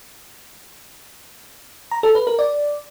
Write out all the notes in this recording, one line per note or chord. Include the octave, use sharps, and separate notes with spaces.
A#5
A4
B4
A#4
D5